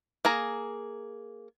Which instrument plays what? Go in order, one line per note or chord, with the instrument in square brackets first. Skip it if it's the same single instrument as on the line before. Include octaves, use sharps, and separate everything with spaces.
[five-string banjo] A#3 G#4 A#5